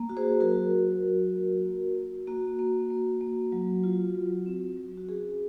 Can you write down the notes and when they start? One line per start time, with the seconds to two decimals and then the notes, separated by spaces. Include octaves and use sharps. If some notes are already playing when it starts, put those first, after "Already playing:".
Already playing: A#3
0.09 F#4
0.17 G#4 C5
0.40 F#3 F#4 A#4
0.71 F#3
1.03 F#3
1.34 A#3
1.65 A#3
1.96 F#4
2.27 A#3 F#4
2.59 A#3
2.90 A#3
3.21 A#3
3.52 F#3
3.84 F4
4.15 F#3
4.46 C4
4.77 F#3
4.97 F#4
5.08 C#4 G#4